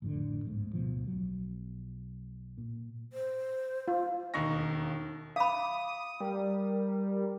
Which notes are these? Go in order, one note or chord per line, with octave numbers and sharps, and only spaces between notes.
A1 F2 A2 D3
D1 G1 G#2 A3
D2 B2 F3
B1 F#3
A#2
C5
F4
E1 D#2 D#4 C#6 A#6
F5 B5 D6 D#6
G3 A#4